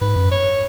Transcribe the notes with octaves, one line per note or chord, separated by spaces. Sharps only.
G#2 B4
F#2
C#5